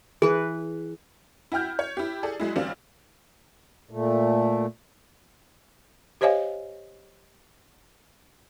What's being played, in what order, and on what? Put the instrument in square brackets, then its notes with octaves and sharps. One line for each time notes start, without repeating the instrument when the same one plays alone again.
[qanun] E3 B4 [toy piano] G#4
[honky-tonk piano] E4 F#4 G5 F6 G6
C#5
E4 G4
G#4 A4 D5
F#3 G#3 E4
A1 G3 C4 D4 F4
[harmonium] A#2 A3
[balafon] G4 C5 C#5 D#5 F5 G#5